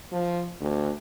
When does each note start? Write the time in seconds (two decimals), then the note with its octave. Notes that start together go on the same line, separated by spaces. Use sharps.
0.12 F3
0.60 D2